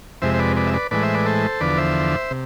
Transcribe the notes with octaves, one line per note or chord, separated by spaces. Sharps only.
F2 C3 G#3 C5 E5
C5
B4 D5
B4 D5
E5
B4 D5
A2 E3 G#3 B4 D5
C5 E5
B4 D5
A4 C5
E2 D3 F3 B4 D5
C5 E5
C3